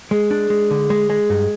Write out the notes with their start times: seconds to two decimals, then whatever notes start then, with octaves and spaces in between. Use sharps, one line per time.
0.11 G#3 G#4
0.31 D4
0.50 G#3
0.71 D3
0.90 G#3
1.10 G#3
1.30 G2